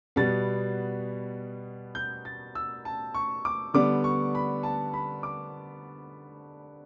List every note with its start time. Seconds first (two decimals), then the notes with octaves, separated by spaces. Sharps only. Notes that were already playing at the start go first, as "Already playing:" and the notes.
0.16 B2 G3 B3 A6
1.95 G6
2.25 A6
2.55 E6
2.85 A5
3.15 C#6
3.45 D6
3.74 D3 G3 B3 D4 D6
4.04 C#6
4.35 B5
4.63 A5
4.94 B5
5.23 D6